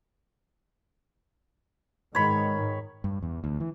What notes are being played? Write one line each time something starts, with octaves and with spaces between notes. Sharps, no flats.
G#2 D#3 C#5 B5
G2
E2
D2
E3